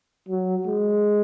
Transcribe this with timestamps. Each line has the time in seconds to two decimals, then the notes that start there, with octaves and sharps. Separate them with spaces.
0.29 F#3
0.67 G#3